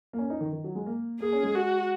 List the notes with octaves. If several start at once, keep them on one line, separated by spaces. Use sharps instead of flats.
A#3
C#4
D#4
D#3
D#3
F#3
G#3
A#3
A#3 G#4
C#4
G#3
F#4